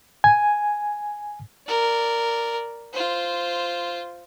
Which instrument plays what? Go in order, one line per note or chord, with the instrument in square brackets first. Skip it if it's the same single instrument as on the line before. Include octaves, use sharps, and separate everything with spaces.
[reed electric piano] G#5
[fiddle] A#4 D5
F4 C5